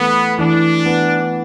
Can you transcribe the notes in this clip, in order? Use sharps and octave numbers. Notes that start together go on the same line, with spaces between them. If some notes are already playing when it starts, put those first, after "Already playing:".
Already playing: E3 A3 B3
E3 D4
B3